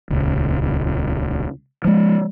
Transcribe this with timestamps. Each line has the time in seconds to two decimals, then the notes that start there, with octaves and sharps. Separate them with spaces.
0.10 D#1 C#2
1.84 F3 G#3